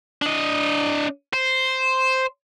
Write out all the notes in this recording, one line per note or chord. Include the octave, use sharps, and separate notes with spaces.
D4 D#5
C5